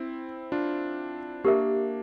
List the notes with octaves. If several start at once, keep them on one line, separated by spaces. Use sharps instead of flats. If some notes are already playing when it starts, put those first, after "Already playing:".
Already playing: C4 E4
D4 F4
A#3 D4 G4 A#4 E5